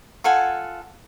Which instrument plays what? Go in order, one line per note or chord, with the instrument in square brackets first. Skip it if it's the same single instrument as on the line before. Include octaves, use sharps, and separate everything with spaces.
[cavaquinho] F4 A4 F#5 G#5